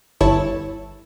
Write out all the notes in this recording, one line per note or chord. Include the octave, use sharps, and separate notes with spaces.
G1 E4 C#5 A5